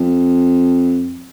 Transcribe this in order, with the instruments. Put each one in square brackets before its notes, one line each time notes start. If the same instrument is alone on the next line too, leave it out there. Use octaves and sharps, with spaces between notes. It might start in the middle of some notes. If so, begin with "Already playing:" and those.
Already playing: [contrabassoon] F2